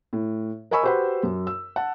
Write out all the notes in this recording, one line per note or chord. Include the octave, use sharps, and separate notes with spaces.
A2
A#4 D#5 G#5 B5 C#6 E6
F#4 G4 B4 C5 F#5 B5
F#2
E6
F#5 A5